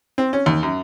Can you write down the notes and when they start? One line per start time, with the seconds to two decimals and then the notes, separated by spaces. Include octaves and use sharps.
0.18 C4
0.33 C#4
0.46 D#2
0.63 F#2